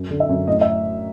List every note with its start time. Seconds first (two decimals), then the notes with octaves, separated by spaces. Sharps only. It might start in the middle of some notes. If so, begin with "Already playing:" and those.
Already playing: F#2
0.11 D3
0.20 E5
0.29 F#2
0.48 A2 D#5
0.61 E5